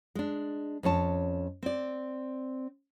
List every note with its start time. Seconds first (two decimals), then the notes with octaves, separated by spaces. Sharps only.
0.15 G#3 D4
0.83 F2 C#4 C#5 A5
1.63 C4 D5